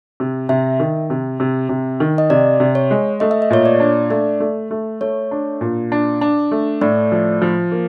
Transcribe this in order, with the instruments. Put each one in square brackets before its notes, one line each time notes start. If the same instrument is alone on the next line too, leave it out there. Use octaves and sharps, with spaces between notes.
[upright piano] C3
[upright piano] C3 [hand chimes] E5
[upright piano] D#3
C3
C3
C3
D#3
[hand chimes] D#5
[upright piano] C3 [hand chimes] D5
[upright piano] C3
[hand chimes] C#5
[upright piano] G#3
[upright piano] A3 [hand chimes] D#5
[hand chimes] E5
D#5
[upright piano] A#2 [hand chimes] C#5
[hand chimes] D5
[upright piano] D4
[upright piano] A3 [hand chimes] D5
[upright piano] A3
A3
[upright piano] A3 [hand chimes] C#5
[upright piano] D4
A#2
D4
D4
A3
[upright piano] A2 [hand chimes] D5
[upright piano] F3
F3
A#3